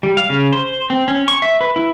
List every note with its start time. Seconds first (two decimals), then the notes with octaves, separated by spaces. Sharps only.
0.03 G3
0.17 F5
0.29 C#3
0.53 C5
0.90 C4
1.08 C#4
1.28 C#6
1.42 E5
1.61 B4
1.76 E4